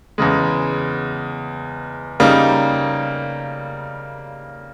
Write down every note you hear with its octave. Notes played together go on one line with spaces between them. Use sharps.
E2 C#3 G#3
C#3 G3 A#3 D#4